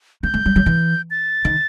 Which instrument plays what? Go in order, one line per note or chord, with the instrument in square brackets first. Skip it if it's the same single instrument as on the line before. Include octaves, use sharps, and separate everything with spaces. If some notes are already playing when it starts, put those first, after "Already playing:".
[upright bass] A3 [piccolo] G6
[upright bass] A3
G3
F#3
E3
[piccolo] A6
[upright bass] D#3